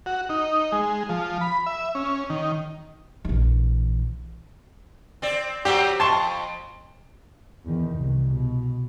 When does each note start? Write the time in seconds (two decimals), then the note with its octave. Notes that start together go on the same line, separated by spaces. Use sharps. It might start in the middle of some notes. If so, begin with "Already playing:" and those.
0.06 F#4
0.29 D#4
0.72 G#3
1.09 F3
1.41 B5
1.66 E5
1.95 C#4
2.30 D#3
3.25 A#1 E3
5.22 C4 D5
5.65 F#3 C4 F#4 G4
6.00 F2 A5 C6 C#6
7.65 E2 D#3
7.98 C2
8.30 B2